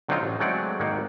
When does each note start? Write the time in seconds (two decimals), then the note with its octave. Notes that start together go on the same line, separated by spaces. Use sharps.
0.08 D3 F#3 C4 D#4 F4
0.21 A1
0.40 F#3 G#3 A3 C4 D5 F#5
0.80 G#1 D#3 A#3 F#5